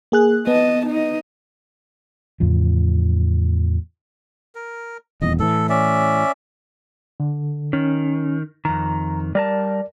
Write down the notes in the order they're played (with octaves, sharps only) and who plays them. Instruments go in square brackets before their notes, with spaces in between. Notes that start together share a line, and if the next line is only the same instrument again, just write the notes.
[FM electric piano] A#3 G#4 F#6
[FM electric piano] B3 [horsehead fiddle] D#5 A5
[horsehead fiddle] D#4 D#5
[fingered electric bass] E2 A2 C#3 F3
[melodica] A#4
[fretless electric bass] D#1 E2 [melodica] D#5
[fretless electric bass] A2 E3 [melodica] A4
[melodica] C#4 D5 E5
[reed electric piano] D3
[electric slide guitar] D#3 [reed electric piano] C#4
[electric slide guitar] F2 D#3 [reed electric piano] A#5
[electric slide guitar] G3 A#4 A5 [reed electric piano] D5